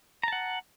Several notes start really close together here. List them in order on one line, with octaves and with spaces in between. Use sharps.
A#5 A5 F#5